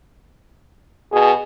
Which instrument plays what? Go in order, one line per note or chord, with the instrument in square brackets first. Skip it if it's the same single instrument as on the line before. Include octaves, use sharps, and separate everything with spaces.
[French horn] B2 [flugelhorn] G#4